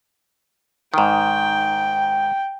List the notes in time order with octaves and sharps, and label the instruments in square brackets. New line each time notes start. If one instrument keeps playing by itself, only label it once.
[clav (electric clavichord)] G#2 D#3 [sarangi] G5